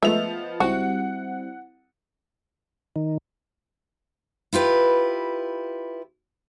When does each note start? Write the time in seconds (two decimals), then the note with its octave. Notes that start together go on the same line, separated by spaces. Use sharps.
0.03 F3 G#3 A3 B3 D#5 E5 F7
0.60 C#2 G3 C4 E4 F#4 F#5
2.96 D#3
4.53 E4 F4 G4 B4